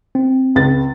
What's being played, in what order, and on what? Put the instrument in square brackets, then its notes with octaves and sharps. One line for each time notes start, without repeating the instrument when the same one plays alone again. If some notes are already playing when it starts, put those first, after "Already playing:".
[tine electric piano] C4
[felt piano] C#2 A6